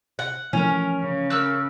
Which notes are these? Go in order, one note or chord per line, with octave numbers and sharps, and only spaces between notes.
F#5
E3 F3 A3 C#4 A#4
C#3
A#4 E6 F#6